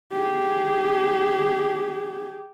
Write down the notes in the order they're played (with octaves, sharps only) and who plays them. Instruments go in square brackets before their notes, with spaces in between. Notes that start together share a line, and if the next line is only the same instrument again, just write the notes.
[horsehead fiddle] G4 G#4